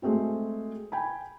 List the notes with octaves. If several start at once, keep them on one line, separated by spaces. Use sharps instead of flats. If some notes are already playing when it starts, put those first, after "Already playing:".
G#3 A3 C4 F#4
G5 G#5 B5